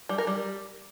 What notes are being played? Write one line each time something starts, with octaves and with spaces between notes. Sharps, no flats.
G3
A#4
G3